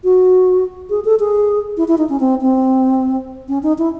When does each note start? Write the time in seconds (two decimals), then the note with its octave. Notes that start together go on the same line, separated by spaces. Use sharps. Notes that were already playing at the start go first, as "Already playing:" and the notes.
0.04 F#4
0.90 G#4
1.05 A4
1.20 G#4
1.77 E4
1.88 E4
1.98 D#4
2.09 C#4
2.20 C4
2.41 C4
3.49 C#4
3.63 D#4
3.78 E4